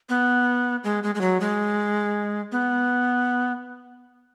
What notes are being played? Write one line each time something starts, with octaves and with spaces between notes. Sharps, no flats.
B3
G#3
G#3
G#3
F#3
G#3
B3